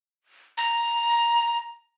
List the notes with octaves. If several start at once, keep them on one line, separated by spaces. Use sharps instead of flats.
A#5